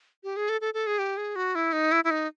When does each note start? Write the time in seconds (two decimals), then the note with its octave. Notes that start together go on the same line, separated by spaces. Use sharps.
0.24 G4
0.36 G#4
0.49 A4
0.61 A4
0.74 A4
0.87 G#4
0.99 G4
1.17 G#4
1.36 F#4
1.55 E4
1.73 D#4
1.92 E4
2.04 E4
2.11 D#4